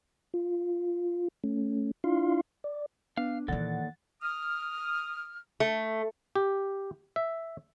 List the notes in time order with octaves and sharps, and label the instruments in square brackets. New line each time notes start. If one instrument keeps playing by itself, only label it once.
[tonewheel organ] F4
A3 C#4
D4 E4 F4 F5 C6
D5
[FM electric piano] B3 [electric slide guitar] D4 [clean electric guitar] F5
[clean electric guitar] D#2 [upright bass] A#2 E3 [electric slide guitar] A4 D5 [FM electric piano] F#5 A6
[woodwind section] D#6 F6
[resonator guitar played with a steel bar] A3
[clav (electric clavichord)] G4
E5